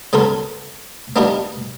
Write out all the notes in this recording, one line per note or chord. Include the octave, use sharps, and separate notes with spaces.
C#3 B3 A4 A#4 C6
B3 D4 D#4 F4 G4 A#4